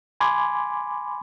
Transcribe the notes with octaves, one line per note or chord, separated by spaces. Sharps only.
G#5 B5 C6 D6 G#6